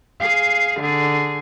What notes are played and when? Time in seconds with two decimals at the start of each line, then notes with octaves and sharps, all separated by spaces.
0.20 G#4 F5
0.79 D3 G#4